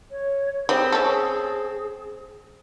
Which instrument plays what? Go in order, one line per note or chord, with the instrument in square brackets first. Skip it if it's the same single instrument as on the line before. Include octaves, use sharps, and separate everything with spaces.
[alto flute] C#5
C#5
[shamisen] G3 [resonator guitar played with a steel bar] C4 [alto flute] G#4
[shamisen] C#4 A4